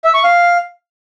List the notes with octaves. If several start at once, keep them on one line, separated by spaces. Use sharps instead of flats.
E5
C#6
F5